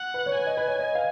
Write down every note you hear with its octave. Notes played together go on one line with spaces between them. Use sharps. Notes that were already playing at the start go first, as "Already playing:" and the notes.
Already playing: F#5
B4
C#5
B4 G#5
D#5
B4
C#5
D#5
F5